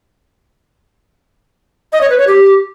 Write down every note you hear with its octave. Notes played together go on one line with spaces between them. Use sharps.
D#5
C#5
B4
C#5
G4